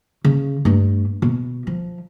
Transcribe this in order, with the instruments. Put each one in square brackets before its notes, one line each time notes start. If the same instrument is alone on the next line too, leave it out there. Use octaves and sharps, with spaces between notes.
[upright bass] C#3
G2 A3
B2
F3